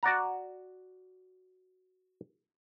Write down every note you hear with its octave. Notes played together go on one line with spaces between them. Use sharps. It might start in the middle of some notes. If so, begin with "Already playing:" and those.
F#4 D5 F#5 A#5